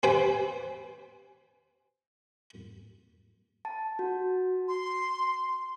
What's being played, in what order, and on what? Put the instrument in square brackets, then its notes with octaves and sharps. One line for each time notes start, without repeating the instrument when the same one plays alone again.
[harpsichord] C4 G4 B4 C5 G5 G#5
[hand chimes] A5
F#4
[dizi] C6